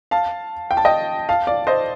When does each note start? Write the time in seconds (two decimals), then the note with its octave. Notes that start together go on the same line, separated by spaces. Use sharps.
0.11 F5 A5
0.71 G5
0.77 A5
0.85 D#5 G5
1.29 F5 A5
1.47 D5 F5
1.67 C5 D#5